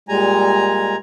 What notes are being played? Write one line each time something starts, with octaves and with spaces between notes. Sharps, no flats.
A#2 G3 G#3 G#5 A#5